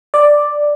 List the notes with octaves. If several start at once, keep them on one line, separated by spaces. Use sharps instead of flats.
D5